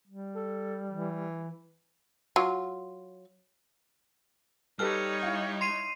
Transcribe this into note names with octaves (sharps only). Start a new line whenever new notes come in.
G3
A4
E3
F#3 F4
G3 D#4 G4 A4 B4 C#5 F6
E4 F5
C6 C7 D#7